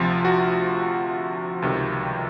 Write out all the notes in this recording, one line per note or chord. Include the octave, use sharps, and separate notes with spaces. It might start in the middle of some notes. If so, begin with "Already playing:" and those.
Already playing: D2 C3 F3 F4
F#4
C#2 C3 D#3 G3